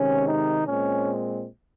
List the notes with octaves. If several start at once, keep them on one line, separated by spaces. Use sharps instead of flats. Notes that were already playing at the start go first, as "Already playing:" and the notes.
Already playing: C3 D#3 G#3 C#4
D#4
A#2 G#3 C4 C#4